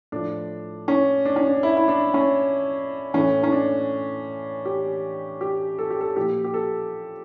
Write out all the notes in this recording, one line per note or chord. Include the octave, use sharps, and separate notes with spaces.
A2 F3 D4
C#4
D4
C#4
D4
E4
E4
D4
C#4
A2 E3 C#4
C#4
D4
G4
G4
A4
G4
A4
A#2 F3 G4
G4
A4